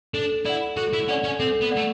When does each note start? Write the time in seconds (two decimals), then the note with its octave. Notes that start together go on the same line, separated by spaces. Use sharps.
0.14 D4 A4
0.46 E4 D5 F#5
0.77 F#4 A4
0.93 E4
1.08 C#4 D5 F#5
1.24 C#4
1.40 C4 A4
1.62 B3
1.71 D5 F#5
1.77 A3